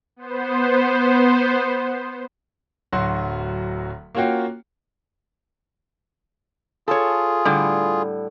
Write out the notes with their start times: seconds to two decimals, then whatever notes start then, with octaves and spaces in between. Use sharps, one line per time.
0.16 B3 C5
2.93 D1 F#3 F#4 C6
4.15 A#3 C#4 F4 F#4 G5
6.88 F4 G#4 A4 C#5
7.45 A2 D3 G3